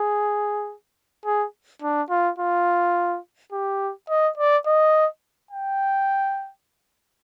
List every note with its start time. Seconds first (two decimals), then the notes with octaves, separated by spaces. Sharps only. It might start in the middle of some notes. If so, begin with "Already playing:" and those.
Already playing: G#4
1.26 G#4
1.82 D4
2.10 F4
2.39 F4
3.53 G4
4.10 D#5
4.38 D5
4.67 D#5
5.51 G5